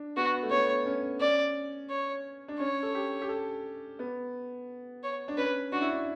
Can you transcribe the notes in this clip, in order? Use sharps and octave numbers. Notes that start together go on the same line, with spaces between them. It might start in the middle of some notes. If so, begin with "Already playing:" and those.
Already playing: D4
B3 F#4
A3
B3 C#5
C#4
C#4 D5
C#5
D4
C#4 C#5
A4
G4
G4
A4
B3
C#5
D4
C#4 B4
D4 F#4
E4
D4